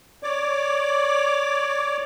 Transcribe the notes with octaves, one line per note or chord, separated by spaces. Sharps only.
C#5 D5 D6